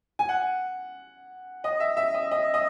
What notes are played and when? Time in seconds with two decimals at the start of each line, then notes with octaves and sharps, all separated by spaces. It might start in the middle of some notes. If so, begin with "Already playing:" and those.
0.19 G#5
0.29 F#5
1.64 D#5
1.80 E5
1.97 E5
2.14 D#5
2.31 D#5
2.54 D#5